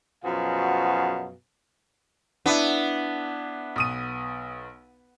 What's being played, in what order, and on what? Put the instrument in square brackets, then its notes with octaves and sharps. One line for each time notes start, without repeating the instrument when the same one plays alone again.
[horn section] F#2 B2 F3 F#4 G#4 F5
[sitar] B3 [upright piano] D4 E4
[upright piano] B1 D#6 D#7